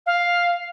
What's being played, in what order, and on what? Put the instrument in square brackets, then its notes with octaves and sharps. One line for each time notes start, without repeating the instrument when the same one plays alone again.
[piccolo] F5